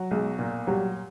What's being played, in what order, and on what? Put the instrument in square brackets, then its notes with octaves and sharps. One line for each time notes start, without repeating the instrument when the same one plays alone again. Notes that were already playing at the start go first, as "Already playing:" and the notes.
Already playing: [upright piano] F#3
[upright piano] B1 [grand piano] G#3
[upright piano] A#2
[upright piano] F#3 [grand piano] G3